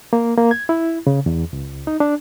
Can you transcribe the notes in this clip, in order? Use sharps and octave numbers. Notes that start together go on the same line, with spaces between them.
A#3
A#3
G#6
E4
C#3
E2
C#2
D#4
D4